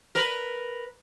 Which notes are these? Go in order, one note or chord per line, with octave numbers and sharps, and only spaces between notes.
A#4 B4